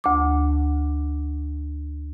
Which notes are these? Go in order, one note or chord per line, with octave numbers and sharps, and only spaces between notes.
D2 D6